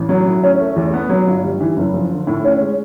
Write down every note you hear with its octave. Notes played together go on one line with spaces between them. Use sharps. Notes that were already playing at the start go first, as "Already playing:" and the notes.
Already playing: A1
F#3
A2
C#4
A3
E2
B3
F#3
G1
G3
E3
F#1
F3
D3
A2
C#4
G#3